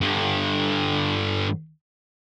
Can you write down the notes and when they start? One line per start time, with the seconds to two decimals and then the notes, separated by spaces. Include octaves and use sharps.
0.01 G2 D3